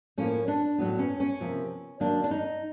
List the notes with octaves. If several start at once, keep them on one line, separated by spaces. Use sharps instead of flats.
A2 F3 A#3 C#4
D4
A2 F#3 B3
C#4
C#4
C3 F3 A#3
D#3 F#3 A#3 D4
D4
D#4